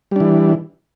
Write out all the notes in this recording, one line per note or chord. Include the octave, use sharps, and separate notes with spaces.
E3 G3 D4